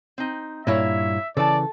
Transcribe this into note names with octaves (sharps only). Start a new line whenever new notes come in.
C4 D#4
G2 A#2 A#3 E4 C#5 E5
C#3 E3 A4 D5 A5